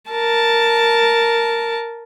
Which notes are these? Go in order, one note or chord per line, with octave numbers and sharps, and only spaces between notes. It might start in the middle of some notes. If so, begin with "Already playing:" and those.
A#4 A5